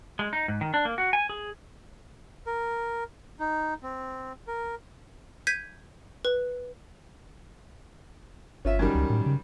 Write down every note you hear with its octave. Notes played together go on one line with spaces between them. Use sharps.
G#3
D#4
G#2
D#3
D4
A#3
F#4
G#5
G#4
A#4
D#4
C4
A#4
G6 G#6 B6 D#7
B4
G1 C#4 F4 E5
F#2 D#3 G3
C#2
A2
C#3